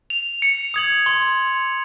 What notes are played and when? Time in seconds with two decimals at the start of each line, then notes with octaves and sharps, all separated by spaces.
0.10 F7
0.42 C#7
0.74 D#6 G#6 F#7
1.06 C6